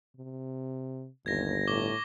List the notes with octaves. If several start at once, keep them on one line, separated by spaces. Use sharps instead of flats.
C3
G1 D#2 G#6 A#6
A2 C#6 D6 G7